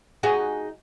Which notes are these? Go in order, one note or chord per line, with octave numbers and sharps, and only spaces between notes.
D#4 F#4 G#4